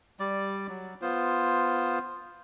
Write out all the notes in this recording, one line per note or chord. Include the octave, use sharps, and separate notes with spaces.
G3 D5
F#3
B3 F4 C5